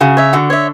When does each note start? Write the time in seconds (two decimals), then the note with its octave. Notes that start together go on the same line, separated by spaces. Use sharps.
0.01 C#3 F#4
0.17 C#5 E5
0.33 D3 F#4
0.50 C#5 E5